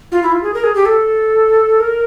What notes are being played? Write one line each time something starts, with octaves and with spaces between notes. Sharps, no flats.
F4
E4
F4
G#4
A#4
G#4
G4
A4
A#4